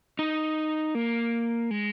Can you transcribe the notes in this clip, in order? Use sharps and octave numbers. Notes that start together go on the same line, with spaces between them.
D#4
A#3
G#3